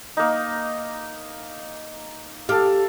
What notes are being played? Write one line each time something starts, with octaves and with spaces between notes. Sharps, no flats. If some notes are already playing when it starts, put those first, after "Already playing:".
A#3 D#4
G4 A4 F5